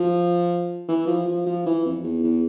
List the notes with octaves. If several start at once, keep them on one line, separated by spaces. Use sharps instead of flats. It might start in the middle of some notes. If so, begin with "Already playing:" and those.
Already playing: F3
E3
F3
F3
F3
E3
F2
E2
E2